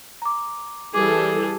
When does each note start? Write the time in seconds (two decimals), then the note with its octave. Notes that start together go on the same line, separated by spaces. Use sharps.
0.22 A#5 D6
0.94 E3 G3 G#4 A4 D6